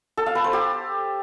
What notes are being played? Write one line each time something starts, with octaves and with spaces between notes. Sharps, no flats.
A4
F5
B4
C5
G4